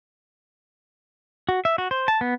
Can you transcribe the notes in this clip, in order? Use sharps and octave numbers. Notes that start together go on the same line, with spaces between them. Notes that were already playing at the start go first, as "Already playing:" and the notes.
F#4
E5
F#4
C5
A5
B3